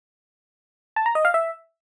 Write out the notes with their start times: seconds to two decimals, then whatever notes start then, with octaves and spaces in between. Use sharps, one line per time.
0.96 A5
1.06 A#5
1.15 D#5
1.25 F5
1.34 E5